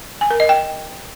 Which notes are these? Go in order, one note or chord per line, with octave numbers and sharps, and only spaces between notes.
G#5
A#4
D#5
G5